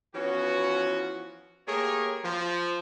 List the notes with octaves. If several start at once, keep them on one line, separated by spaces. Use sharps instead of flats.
E3 F3 B3 C#4 F#4
A3 A#3 G4 G#4 A#4 C#5
F3